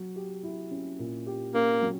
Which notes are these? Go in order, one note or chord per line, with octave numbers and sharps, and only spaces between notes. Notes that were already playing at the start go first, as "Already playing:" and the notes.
Already playing: F#3
G4
E4
C#4
A#2
G4
A#3 C#4
F#3